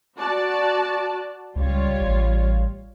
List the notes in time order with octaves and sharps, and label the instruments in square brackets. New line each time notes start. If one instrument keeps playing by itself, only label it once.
[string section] F#4 D5 A5
[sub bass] C#2 [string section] G3 F4 C#5
[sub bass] A1